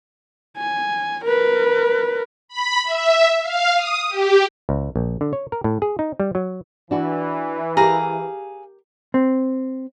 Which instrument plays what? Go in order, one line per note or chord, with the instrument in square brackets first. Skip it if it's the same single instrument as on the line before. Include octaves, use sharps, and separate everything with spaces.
[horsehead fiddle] G#5
A#4 B4
[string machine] B5
E5
F5
D#6
G4
[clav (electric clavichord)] C#2
A#1
D3
C#5
A#4
A2
G#4
D#4
G3
F#3
[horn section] E3 [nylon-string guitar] D4 F#4
[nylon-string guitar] G4 A#4 [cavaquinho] G#4 F5 A#5
[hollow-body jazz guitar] C4